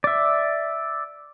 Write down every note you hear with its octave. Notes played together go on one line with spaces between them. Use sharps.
D5 E5